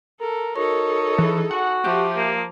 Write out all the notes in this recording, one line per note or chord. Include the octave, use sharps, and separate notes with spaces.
A4 A#4
D#4 F#4 A4 A#4 C#5 D#5
E3 G#4
F#4 F#5 G#5
F3 G4 E5 D6
A#3